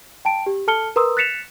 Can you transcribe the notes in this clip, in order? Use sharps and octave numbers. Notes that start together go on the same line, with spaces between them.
G5 A5 D7
G4
A4 A5 F6 C#7 G7
A#4 B4 A#5 C6 D#6 E6
F#6 A6 B6 C#7 E7 F7